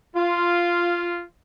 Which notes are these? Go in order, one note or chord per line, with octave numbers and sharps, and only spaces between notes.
F4